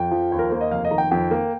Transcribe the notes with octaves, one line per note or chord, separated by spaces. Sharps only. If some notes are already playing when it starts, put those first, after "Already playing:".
Already playing: F2 G5
F3
D#2
A#4
A#3 C5
D#5
F1 F5
D#5
D#3 A#5
G5
F2 G5
A#3